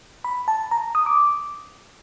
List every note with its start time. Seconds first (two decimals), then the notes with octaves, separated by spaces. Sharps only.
0.24 B5
0.48 A5
0.71 A#5
0.95 D#6
1.06 D6